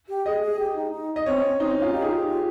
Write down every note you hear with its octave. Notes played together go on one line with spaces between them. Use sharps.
G4
G#4 D#5
G#4
G4
D#4
D#4
D#5
C4 C#5
C#4
C4 D#4
D#4
C#4 F4
D#4 G4
G#4
F4 G4
F4